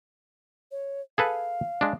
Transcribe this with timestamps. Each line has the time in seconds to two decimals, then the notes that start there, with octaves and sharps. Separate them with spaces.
0.71 C#5
1.18 G#4 A4 B4 F5
1.81 G#3 D4